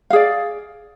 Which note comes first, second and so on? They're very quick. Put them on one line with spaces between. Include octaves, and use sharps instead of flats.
F5 G#4 D5